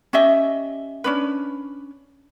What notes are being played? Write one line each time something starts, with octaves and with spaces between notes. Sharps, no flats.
C#4 G4 D#5 E5
C#4 D4 B4